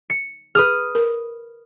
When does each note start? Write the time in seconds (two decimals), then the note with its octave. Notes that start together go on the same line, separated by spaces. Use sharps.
0.10 C#7
0.55 G#4 B4 D#6 F6
0.95 A#4